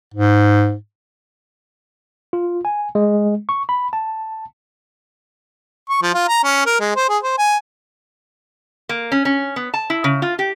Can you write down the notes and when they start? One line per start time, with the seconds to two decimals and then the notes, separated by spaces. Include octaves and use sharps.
0.14 G#2
2.33 F4
2.65 G#5
2.95 G#3
3.49 C#6
3.69 B5
3.93 A5
5.89 C#6
6.02 F3
6.14 F4
6.28 A#5
6.44 C#4
6.66 A#4
6.80 G#3
6.96 C5
7.09 G#4
7.23 C5
7.38 G#5
8.89 A#3
9.12 C#4
9.25 C#4
9.56 B3
9.74 A5
9.90 E4
10.04 C#3
10.22 F4
10.39 G4